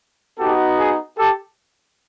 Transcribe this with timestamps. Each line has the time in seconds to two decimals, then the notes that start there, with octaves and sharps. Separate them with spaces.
0.39 B3 D#4 F#4 G4 A4
0.79 G#4
1.18 G4 A4